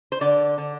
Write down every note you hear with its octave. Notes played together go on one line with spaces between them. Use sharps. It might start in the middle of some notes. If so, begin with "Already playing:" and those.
C5
D3 D5
D3